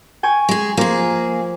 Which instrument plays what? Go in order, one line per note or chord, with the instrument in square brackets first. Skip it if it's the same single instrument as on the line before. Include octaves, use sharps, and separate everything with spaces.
[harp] G5 G#5 C#6
[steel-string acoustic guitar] G#3 G#4
[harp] F3 [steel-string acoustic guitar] A#3 G#4